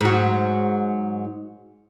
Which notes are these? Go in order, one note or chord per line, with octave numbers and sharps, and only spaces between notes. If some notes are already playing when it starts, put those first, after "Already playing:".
G#2 F#3